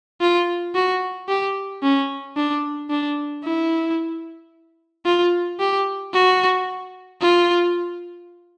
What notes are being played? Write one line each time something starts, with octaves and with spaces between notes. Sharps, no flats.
F4
F#4
G4
C#4
D4
D4
E4
F4
G4
F#4
F4